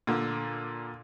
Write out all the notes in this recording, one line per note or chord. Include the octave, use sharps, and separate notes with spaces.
A#2 D3